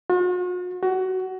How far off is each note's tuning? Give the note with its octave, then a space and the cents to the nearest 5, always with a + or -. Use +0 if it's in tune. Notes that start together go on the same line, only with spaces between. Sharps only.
F#4 -45
F#4 +20